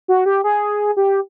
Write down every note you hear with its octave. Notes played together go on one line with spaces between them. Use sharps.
F#4
G4
G#4
G4